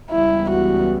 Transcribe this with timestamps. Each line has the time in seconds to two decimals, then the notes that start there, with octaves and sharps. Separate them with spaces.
0.11 C#2 C#3 E3 G3 B3 E4
0.50 F#4